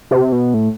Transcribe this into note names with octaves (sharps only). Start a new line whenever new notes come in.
C3
B2
A2